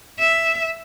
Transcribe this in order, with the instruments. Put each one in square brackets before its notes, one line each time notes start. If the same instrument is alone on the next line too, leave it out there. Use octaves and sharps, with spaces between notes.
[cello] E5